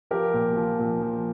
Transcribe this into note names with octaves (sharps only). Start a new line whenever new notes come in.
F3 G4 A#4
A#2
F3
A#2
F3